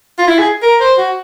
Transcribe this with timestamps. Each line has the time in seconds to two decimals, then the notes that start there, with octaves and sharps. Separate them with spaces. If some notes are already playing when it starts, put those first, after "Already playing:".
0.19 F4
0.27 E4
0.39 G#4
0.62 A#4
0.80 C5
0.98 F#4